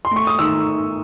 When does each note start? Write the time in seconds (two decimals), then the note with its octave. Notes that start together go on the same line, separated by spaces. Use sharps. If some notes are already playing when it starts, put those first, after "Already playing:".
0.05 C6
0.11 A3 C#6
0.27 D#6
0.39 D#3 E6